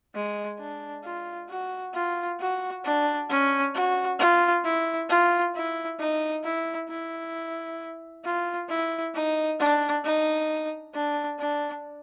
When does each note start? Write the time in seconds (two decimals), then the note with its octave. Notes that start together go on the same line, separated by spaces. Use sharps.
0.15 G#3
0.59 D4
1.04 F4
1.49 F#4
1.94 F4
2.39 F#4
2.84 D4
3.29 C#4
3.75 F#4
4.19 F4
4.64 E4
5.09 F4
5.55 E4
6.00 D#4
6.44 E4
6.89 E4
8.24 F4
8.69 E4
9.15 D#4
9.60 D4
10.04 D#4
10.94 D4
11.39 D4